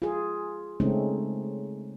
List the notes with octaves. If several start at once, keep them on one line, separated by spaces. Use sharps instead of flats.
F4 G#4
C#3 G#3 A3 C4 C#4 D#4